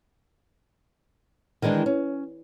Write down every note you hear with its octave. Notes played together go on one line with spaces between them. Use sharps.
D#3 E3 G#3 D4 D#4
C#4